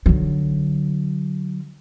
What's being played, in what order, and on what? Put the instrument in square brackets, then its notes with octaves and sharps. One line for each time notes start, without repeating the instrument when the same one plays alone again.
[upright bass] D3 F#3